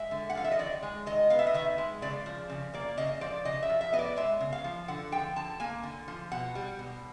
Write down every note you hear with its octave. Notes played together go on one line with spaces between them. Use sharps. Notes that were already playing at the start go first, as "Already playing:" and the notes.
Already playing: G#3 E5
D3
F#5
F3 F5
E5
D#5
D#3 D5
G#3
D#3 D#5
B3 F5
E5
D#5
D#3 E5
G#3
C#3 D5
F3
C#3
A#3 D5
C#3 D#5
F3 D5
C#3 D#5
E5
F3
E5
B3 D#5
D5
G#3 E5
C#3
F5
F3
D3 F#5
F3 G5
D3 A5
A#3 G#5
D3
F3
B2 F#5
G3
B2